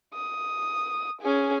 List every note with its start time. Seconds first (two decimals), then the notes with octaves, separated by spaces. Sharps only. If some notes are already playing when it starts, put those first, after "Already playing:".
0.14 D#6
1.22 C#4 G#4